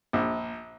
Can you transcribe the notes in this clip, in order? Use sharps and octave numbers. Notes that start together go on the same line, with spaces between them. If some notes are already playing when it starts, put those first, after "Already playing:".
A#1